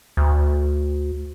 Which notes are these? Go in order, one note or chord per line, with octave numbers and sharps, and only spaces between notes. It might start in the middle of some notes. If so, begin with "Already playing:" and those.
D2